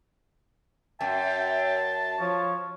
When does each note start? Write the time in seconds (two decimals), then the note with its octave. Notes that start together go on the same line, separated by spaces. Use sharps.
1.01 F#2 E5 G5 A5
2.19 F3 C#5